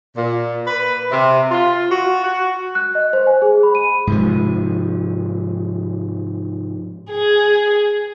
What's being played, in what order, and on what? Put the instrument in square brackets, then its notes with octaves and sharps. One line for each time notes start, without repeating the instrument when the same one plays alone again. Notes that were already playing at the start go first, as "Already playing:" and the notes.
[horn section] A#2
B4
C3
F4
F#4
F#4
[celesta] F#6
D#5
C5
G#5
G#4
B5
D#7
[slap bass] G#2 C3 F3
[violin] G#4